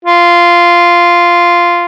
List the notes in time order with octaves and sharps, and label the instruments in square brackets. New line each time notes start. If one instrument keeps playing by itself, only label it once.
[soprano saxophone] F4